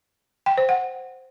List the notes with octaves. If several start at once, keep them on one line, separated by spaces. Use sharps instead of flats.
G5
C5
F#5